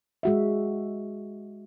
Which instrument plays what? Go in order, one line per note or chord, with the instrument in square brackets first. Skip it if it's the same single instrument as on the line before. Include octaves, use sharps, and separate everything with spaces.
[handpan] G#3 F#4 E5